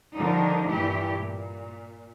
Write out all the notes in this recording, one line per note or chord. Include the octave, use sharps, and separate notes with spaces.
D3 D#3 F3 G3 D4 D#4
G2 A#2 E3 E4 G4
A#2